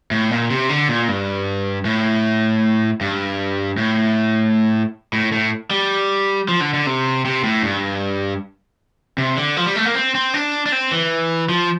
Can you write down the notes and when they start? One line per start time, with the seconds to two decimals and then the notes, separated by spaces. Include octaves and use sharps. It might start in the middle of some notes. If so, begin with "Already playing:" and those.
0.11 A2
0.31 A#2
0.50 C3
0.69 D3
0.88 A#2
1.08 G2
1.85 A2
3.01 G2
3.78 A2
5.13 A2
5.32 A2
5.71 G3
6.48 F3
6.61 D3
6.74 D3
6.87 C3
7.25 C3
7.44 A2
7.63 G2
9.18 C3
9.37 D3
9.57 F3
9.66 G3
9.76 A3
9.85 A#3
9.95 C4
10.15 C4
10.34 D4
10.66 D4
10.72 C4
10.92 E3
11.49 F3